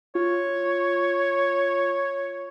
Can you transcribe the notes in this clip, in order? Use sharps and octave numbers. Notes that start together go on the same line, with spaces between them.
F4 C#5